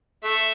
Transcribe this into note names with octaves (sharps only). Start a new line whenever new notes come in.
A3 E5